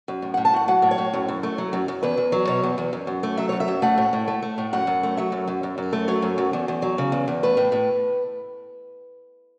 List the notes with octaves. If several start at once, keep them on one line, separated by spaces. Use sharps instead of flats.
F#2
A2
A2 F#5
A5
A3 F#5
F#3 F#5
A2
C#5
A2
F#2
F#2
A3
F#3
F#2
F#2
E2 B4
E2
F#3
B2 C#5
E2
E2
F#2
F#2
A3
F#3 E5
F#2 C#5
E5
F#2
A3 F#5
A2
A2
A3
A3
A2
F#2 F#5
F#2
A3
F#3 E5
F#2
F#2
F#2
F#2
A3
F#3 C#5
F#2
F#2
E2
E2
F#3
C#3
E2
E2
A3 B4
A2
A2